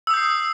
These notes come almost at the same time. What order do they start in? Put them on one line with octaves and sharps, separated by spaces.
E6 D#6 G6 C7